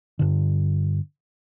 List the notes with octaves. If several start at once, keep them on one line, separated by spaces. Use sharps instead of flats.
G2 D3